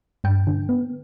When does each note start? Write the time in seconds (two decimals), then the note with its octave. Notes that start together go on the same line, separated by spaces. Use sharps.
0.24 G2 G5
0.47 D3
0.69 B3